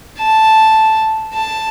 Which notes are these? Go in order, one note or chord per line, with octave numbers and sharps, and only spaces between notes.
A5
A5